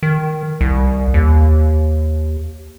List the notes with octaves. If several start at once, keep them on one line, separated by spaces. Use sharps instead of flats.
D#3
C2
D#2